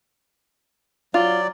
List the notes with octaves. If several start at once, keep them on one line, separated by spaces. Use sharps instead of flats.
F#3 F4 D5